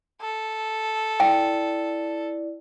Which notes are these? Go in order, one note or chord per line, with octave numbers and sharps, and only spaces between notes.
A4
E4 D5 G5